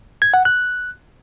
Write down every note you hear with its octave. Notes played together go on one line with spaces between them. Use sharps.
G#6
F#5
F#6